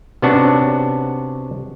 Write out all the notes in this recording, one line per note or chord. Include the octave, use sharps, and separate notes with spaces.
C3 B3 C#4 D4 F#4